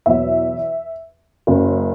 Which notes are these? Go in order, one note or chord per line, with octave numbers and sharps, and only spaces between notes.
E2 B2 F#3 E5
F#1 F#2 C#3 F#3